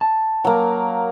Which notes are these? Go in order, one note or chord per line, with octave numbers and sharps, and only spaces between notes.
A5
F#3 A#3